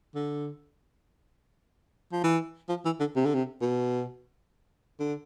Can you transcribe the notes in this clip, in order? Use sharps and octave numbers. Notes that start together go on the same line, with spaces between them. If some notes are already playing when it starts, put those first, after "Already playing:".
D3
F3
E3
F3
E3
D3
C3
D3
C3
B2
D3